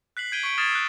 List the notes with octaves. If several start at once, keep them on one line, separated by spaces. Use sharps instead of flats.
F#6 B6 C7 F#7
G6 G#6 D7 D#7 F#7 G7
C#6 F#6 B6 C#7 D7 G7
D#6 F6 G#6 A6 C7 E7
E6 F#6